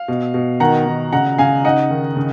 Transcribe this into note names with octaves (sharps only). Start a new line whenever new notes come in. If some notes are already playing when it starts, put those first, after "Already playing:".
Already playing: F5
B2
B2
D#3 F#5 A#5
D#3
C#3 F#5 A#5
C#3 F5 G#5
D#4 D#5 F#5
D#3
C#3